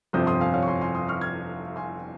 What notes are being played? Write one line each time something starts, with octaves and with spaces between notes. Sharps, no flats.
G1 F2 C3 F3 C4 D#6 G6
C6 D#6
F5 G#5
C#5 F5
C#6
G#5 C6
G#5 C6
C6 D#6
C#6 F6
F6 G#6
G#5 C6